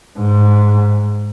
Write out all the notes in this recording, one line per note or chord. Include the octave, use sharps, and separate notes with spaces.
G#2